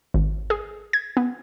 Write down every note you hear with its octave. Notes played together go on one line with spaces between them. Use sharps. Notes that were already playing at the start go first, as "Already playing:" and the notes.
G#1
G#4
G#6
B3